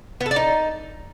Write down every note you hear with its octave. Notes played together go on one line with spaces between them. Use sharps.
B3
A4
D5
D#4